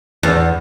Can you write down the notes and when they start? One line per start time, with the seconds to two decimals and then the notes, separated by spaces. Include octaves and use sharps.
0.23 E2